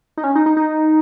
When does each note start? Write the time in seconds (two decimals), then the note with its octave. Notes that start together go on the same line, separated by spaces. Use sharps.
0.17 D#4
0.24 C#4
0.35 D#4
0.46 D#4
0.57 D#4